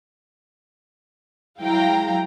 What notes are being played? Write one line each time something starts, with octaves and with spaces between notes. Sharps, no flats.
F#3 G#3 E4 F5 G5 A#5